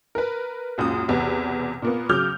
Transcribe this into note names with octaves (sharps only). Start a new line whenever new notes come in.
A#4 B4
C#2 F#2 A#2 D#6
B1 E2 C3 B4
A#2 A#3 B3
C#3 F#3 D6 F6 G6